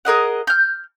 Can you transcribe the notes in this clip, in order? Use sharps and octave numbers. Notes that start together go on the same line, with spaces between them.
G#4 A#4 D#5 F#5
F6 G6